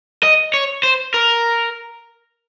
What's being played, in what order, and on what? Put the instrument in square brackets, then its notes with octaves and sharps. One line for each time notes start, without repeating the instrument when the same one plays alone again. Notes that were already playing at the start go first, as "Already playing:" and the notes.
[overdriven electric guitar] D#5
C#5
C5
A#4